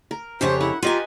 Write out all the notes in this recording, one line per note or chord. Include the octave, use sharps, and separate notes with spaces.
A#4
F2 C#3 G4 C5 C#5 F#5
E4 F#5
F4 G4 B4 D#5 G#5 A#5